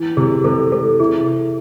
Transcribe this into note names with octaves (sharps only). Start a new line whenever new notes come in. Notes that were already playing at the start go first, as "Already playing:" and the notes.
Already playing: E3
C3 G#4
C3 A4
E3 A4
E4 G#4